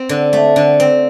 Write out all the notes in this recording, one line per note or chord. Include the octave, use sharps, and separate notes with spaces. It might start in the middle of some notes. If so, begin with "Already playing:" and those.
Already playing: C4
D3
A3
D3
C4